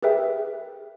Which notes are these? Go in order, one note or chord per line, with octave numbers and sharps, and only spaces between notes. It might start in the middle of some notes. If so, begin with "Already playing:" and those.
G4 G#4 A#4 B4 E5 G5